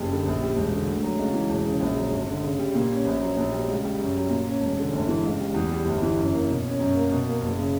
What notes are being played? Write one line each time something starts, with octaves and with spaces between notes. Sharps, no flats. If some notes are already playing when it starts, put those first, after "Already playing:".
Already playing: F#1 G3
D3
A#1
G3
E1
D3
D2
F#3
C#2
E3
E1
C#3
A#1
F#3
G1
D3
C#3
G3
A#2
C#4
A#1
F#3
A#1
G3
C#2
G3
F#2
F#3
A#2
C#4
E1
D3
G1
E3
C#2
G3
E2
G3
G1
E3
F#2
A#3
B2
C#4
F#2
A#3
B2
A#3
F#1
C#3